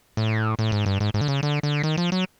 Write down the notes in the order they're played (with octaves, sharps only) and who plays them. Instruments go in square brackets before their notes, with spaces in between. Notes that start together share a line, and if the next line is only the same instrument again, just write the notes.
[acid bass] A2
A2
G#2
G2
G#2
G#2
D3
C#3
D3
D3
D#3
F3
F#3